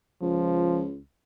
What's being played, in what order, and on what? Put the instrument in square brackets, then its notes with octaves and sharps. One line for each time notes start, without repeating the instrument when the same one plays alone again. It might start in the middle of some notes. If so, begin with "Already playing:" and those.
[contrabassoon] C#2 [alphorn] F3